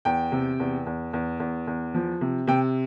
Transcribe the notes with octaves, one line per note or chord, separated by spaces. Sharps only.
E2 G5
C3
E2
E2
E2
E2
E2
F3
C3
C3 G5